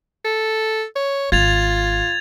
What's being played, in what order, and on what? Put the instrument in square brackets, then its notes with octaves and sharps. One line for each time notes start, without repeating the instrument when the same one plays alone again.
[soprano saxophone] A4
C#5
[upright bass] G#1 [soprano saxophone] F4 [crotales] G#6 A6 F7